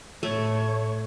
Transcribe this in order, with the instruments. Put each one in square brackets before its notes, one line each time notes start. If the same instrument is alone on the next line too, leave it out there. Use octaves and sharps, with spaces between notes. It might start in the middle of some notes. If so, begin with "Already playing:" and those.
[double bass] A2 [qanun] A3 [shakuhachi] C#5